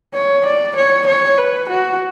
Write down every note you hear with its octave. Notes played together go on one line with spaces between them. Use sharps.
C#5
D5
C#5
C#5
B4
F#4